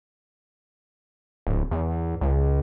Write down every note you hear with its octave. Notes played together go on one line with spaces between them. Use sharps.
D1
E2
C#2